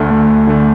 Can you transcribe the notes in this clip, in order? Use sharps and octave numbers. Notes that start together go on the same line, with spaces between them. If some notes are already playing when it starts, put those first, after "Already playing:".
Already playing: D2 D3 A3
D2
D3 A3